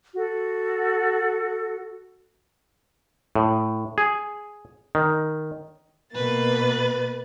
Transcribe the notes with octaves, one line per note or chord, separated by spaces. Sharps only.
F#4 A4
A2
G#4
D#3
B2 A#3 B4 A6